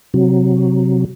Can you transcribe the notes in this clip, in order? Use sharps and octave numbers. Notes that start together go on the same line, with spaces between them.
C3 F#3